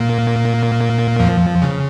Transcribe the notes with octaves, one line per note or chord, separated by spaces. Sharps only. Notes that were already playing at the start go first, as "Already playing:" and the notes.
Already playing: A#2 A#3
F2 F3
C#3